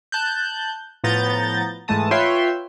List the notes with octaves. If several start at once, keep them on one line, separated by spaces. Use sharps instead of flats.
A5 F#6 G6
A2 F3 B3 A#5 G6 A6
G#2 E3 G#3 A3 A5 D#6
F4 B4 C#5 E5 G5 C6